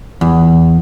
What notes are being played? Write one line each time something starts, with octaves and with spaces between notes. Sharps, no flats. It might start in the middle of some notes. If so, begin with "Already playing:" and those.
E2